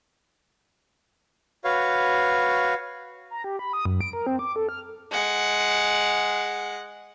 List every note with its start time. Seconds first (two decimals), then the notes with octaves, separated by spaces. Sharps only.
1.64 F#4 B4 C#5 F5
3.31 A#5
3.44 G4
3.59 B5
3.73 D#6
3.85 F#2
4.01 D7
4.13 A#4
4.27 C4
4.39 D6
4.56 A4
4.69 F6
5.11 G#3 F#5